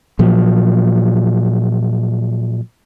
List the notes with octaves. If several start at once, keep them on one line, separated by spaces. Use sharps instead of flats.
A#2 F3 F#3